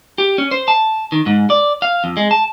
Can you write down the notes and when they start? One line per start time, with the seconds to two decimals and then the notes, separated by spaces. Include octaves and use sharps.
0.18 G4
0.38 C#4
0.51 C5
0.68 A5
1.12 D#3
1.26 G#2
1.50 D5
1.82 F5
2.04 F2
2.17 G#3
2.31 A5